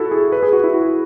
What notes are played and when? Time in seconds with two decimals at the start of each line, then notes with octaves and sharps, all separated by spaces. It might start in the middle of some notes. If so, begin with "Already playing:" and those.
Already playing: E4 F#4 A4
0.11 G#4
0.32 B4
0.43 G#4
0.53 F#4
0.64 E4
0.74 F#4